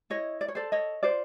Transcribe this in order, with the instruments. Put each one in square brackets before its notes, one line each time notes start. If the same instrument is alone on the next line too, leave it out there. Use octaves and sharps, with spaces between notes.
[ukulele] E4 C#5 D#5
D5
C#5
A4 C5 D5
C#5 D#5
F4 C5 D5